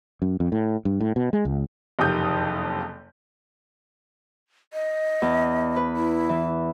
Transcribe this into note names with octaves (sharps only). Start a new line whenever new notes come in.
F#2
F2
A2
G2
A2
B2
G#3
C#2
F#1 F2 C3 D#3 D#6 G6
D#5
E2
B4
E4
E3